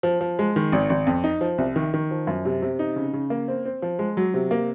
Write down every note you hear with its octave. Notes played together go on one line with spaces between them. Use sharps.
F3
F3
G#3
D#3
G#1
G#1
F2
D#4
F3
C2
D#3
D#3
F3
F#2
C3
C3
D#4
C#3
C#3
A#3
C4
C4
F3
G#3
F#3
C3
A#3